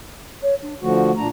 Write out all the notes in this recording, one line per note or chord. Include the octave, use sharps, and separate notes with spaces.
C#5
D4
D3 F3 A3 F#4
A#2 D4 A#5